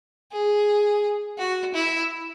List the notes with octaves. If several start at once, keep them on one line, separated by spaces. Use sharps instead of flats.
G#4
F#4
E4